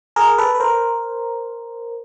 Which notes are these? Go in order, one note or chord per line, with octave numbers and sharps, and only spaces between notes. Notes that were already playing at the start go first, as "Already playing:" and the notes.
G#4 A#4
A4 B4
B4
A#4 C5